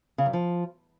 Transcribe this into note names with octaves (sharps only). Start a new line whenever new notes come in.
C#3
F#2
F3